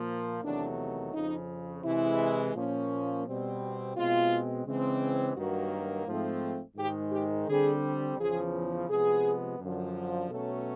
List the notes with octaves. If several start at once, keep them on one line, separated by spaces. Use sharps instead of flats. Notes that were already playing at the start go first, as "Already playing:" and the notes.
Already playing: A#2 F3 A#3
E2 C3 D#3 F#3 A3 D4
F2 C#3 F3 D#4
C3 E3 G#3 E4
A#2 F3 A#3 C#4
B2 G3 C4
B2 G#3 C4 F4
C#3 E3 G#3 C4
G2 D#3 F#3 A#3 F#4
G#2 F3 A3 C4
G#2 D#3 G#3 G4
G4
D3 G3 C4 G#4
E2 C#3 F3 G#4
C3 F3 G#3 B3 G#4
F#2 D3 F3
B2 F#3 A3 C#4 A4